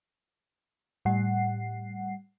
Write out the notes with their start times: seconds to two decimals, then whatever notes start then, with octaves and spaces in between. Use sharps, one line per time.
1.05 A2 G3 F#5 C7